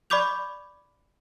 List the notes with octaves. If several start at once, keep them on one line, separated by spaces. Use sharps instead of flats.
D5 B5 C#6 D6 G6 F7